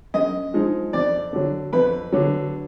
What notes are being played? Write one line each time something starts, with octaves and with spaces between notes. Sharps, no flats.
F#2 D#5
F3 G#3 D#4
F2 D5
D3 F#3
F2 B4
D3 F#3